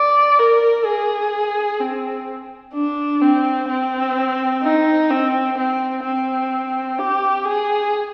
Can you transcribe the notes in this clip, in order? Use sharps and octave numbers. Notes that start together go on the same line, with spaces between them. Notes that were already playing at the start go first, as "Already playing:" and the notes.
Already playing: D5
A#4
G#4
C4
D4
C4
C4
D#4
C4
C4
C4
G4
G#4